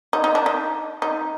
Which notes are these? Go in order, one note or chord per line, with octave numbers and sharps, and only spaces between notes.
D#4
D#4
D4
D#4
D#4